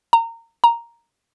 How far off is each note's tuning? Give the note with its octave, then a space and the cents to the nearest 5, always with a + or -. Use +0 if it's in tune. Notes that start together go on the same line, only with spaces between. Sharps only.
A#5 -25
A#5 +0